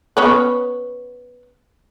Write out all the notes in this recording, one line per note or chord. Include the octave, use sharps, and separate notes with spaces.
B3 C#4 B4